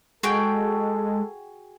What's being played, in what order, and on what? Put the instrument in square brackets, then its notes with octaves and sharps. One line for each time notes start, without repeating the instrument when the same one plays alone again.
[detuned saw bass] G#3 [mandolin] F#4 G#4 G5 [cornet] A4